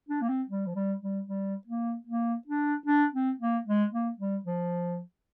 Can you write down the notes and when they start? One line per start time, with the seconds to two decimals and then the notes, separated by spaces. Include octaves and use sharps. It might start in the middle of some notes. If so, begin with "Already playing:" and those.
0.09 D4
0.21 A#3
0.29 C4
0.49 G3
0.66 F3
0.75 G3
1.02 G3
1.27 G3
1.67 A#3
2.07 A#3
2.47 D4
2.86 D4
3.13 C4
3.40 A#3
3.66 G#3
3.92 A#3
4.18 G3
4.45 F3